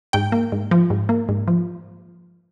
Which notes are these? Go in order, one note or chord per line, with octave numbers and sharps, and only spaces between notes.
G#2 G5
A#3
G#2
F3
G#2
A#3
G#2
F3